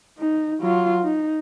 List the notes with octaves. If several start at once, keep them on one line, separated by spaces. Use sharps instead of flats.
D#4
F#3 F4
D#4